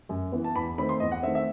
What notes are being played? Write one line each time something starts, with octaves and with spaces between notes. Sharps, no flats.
F#2
E3 B3
A5
E2 B5
D#3 A3 C4 B5
C6
E2 D#5
F#5
D#3 A3 C4 E5
E5